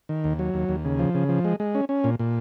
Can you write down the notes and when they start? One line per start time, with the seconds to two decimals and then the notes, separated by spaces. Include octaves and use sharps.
0.09 D#3
0.24 D#2
0.39 F#3
0.54 D#2
0.69 D#2
0.85 C#3
0.99 F3
1.15 C#3
1.29 F3
1.45 G#3
1.60 G#3
1.75 C#4
1.89 C#4
2.04 A#2
2.19 A#2